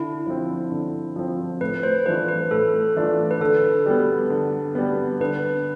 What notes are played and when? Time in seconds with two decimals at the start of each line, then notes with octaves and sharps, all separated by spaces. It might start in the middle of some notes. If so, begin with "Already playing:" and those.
Already playing: D3 E4
0.27 F3 C4
0.72 D3
1.16 F3 C4
1.61 A2 B4
1.83 C5
2.06 E3 A3 D4 F4 B4
2.29 B4
2.51 A2 A4
2.96 E3 A3 D4 F4
3.31 B4
3.40 D3 A4
3.86 G3 B3
4.30 D3
4.75 G3 B3
5.20 D3 B4